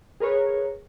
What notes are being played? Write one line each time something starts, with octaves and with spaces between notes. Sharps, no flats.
G#4 A#4 B4 C#5